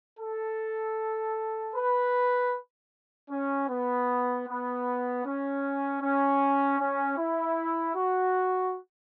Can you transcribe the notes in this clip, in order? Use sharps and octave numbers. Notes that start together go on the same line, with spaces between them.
A4
B4
C#4
B3
B3
C#4
C#4
C#4
E4
F#4